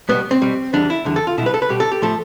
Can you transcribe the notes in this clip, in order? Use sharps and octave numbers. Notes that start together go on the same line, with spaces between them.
B2 G3 B3
C4
B2 G3
E2 D3 G3 D4
E4
E2 D3 G3
A4
F4
B2 G3 E4 B4
A4
B4
B2 G3 G4
A4
G4
A2 F3 A3 A4